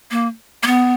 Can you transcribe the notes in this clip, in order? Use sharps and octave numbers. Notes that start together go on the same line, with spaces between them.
A#3
A#3
B3